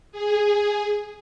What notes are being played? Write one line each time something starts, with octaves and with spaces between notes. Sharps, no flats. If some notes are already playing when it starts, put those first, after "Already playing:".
G#4